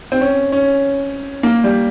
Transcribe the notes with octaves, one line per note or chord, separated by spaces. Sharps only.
C4
C#4
C#4
A#3
G3